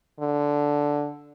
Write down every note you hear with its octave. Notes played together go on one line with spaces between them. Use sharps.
D3